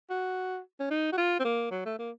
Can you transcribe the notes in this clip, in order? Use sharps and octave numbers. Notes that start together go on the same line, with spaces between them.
F#4
C#4
D#4
F#4
F4
C4
A#3
F#3
A3
A#3